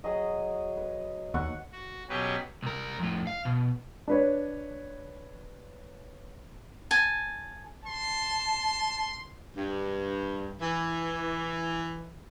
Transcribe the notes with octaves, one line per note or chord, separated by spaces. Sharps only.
F#3 G#4 D#5
B4
D#2 F#5 C#6
F#4
B2 F#3 C#4 G4 G#4 B4
C2 A#4
F2 A2
F5
B2
D4 B4 C#5
G#5 A5
A5 C6
G2
E3